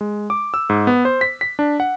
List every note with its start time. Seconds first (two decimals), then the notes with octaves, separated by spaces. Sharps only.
0.01 G#3
0.30 D6
0.54 E6
0.70 G#2
0.87 B3
1.05 C5
1.21 B6
1.41 B6
1.59 D4
1.80 F#5